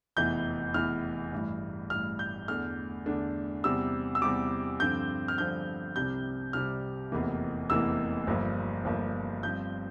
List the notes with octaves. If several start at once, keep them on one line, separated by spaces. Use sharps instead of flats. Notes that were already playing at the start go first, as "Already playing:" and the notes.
F1 E2 E3 G6
F1 E2 E3 F6
A1 G2 E3
A1 G2 E3 F6
G6
E2 D3 A3 D4 F6
E2 D3 A3 D4
E2 C3 G3 E6
E6
E2 C3 G3 D6
G2 D3 F3 C4 G6
F6
G2 D3 F3 C4 G6
C2 C3 G3 G6
C2 C3 G3 F6
F1 E2 C3 E3 A#3
F1 E2 C3 E3 A#3 E6
G1 G2 F3 A#3
G1 G2 F3 A#3
G2 F3 C4 G6